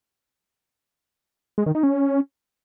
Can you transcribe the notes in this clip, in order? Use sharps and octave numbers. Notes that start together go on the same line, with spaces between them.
G#3
D#3
D#4
C#4